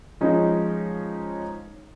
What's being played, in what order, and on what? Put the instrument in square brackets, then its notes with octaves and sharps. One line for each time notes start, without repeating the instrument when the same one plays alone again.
[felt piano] F3 G#3 C#4 D#4